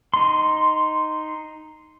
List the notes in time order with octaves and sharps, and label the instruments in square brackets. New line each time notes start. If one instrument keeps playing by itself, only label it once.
[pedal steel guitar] D#4 C6